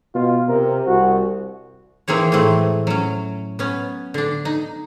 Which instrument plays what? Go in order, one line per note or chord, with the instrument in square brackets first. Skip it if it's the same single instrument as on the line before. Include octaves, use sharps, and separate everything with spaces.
[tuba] B2 [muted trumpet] F4
[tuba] C3 [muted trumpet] A#4
[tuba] C2 [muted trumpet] F#4
[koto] E3 A#3 C4 G#4 C#5
A2 E3 G#3 A3 C4
F#3 C#4
B3 C#4
D3 D4
D#4